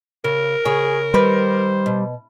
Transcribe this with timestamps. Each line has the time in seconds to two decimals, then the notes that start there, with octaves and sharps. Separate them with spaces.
0.24 C#3 A#4
0.65 C#3 G#4 C#5
1.14 D#3 G3 B4 C5
1.86 B2